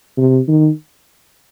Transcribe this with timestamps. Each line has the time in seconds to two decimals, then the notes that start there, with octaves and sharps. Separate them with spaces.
0.18 C3
0.48 D#3